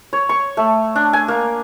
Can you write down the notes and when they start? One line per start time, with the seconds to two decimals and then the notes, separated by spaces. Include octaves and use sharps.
0.13 C#5
0.29 C#6
0.57 A3
0.96 D4
1.13 G#5
1.28 A#3